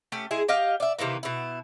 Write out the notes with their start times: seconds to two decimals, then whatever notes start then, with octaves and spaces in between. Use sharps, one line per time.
0.12 A3 C#4 G4
0.31 G#3 E4 G#4
0.48 G4 D#5 F5
0.80 D5 E5
0.99 C3 D#3 E3 A#3
1.23 B2 E4